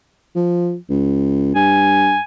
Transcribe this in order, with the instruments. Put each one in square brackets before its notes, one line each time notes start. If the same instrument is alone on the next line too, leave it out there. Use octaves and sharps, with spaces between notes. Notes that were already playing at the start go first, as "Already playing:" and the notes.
[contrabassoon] F3
C#2
[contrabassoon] G2 [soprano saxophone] G#5